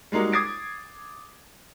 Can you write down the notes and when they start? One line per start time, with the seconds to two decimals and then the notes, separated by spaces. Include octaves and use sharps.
0.12 G3 G#3 A#3 D#4 F#4
0.32 D6 D#6 G#6 A6 C7 D7